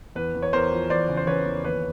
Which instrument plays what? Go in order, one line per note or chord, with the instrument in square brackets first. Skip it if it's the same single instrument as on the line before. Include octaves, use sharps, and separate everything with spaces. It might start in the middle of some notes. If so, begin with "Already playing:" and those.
[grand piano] E2 B4
E2
C#5
E2 A#4 C5
F3
E2 C5 D5
C#3
C5
C#3 B4 C#5
E2
D#2 B4 C#5